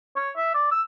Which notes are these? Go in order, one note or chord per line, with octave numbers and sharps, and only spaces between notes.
C#5
E5
D5
E6